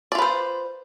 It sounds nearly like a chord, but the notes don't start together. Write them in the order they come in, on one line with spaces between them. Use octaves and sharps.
D5 F4 B4 C5